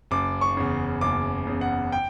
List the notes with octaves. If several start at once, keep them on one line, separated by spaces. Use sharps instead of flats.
F#1 D6
C#6
E2 C#3
F#1 D6
E2 C#3
F#5
G5